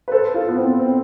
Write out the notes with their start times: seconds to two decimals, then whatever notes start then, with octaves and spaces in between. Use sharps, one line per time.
0.08 B4
0.12 A4 C5
0.34 F4 A4
0.49 B3
0.57 C4
0.79 C4